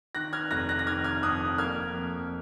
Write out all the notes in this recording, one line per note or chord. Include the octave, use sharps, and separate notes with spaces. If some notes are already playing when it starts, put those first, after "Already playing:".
D#3 F#6 A#6
F6 G#6
F1 F#6 A#6
F#6 A#6
A#6
D#3 F6 G#6
F6 G#6
F2 D#6 F#6
A#3 F6 G#6
F2